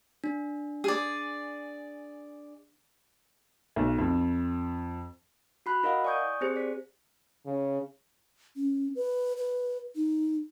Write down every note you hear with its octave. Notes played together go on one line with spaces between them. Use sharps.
D4
G#4 D5
B1
F2
F#4 B5 F#6
E4 A#4 D#5 F5 F#5
D5 G#5 C#6 D#6 G6
C4 G4 G#4 C5
D5 B6
C#3
C#4
B4
B4
D#4